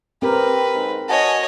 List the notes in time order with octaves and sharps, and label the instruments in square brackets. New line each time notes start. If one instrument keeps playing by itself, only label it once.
[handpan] C4 A#4 [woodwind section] G4 [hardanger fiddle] B4
[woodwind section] G#2
[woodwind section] F#4 G#5 A5 [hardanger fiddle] C#5 D#5